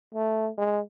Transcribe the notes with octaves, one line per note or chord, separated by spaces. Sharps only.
A3
G#3